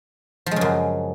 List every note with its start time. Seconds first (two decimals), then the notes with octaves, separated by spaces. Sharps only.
0.46 F3
0.51 G#3
0.56 C#3
0.61 F#2